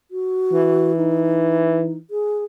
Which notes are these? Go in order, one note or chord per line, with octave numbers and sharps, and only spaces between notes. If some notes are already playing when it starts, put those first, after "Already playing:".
F#4
E3
D#4
G#4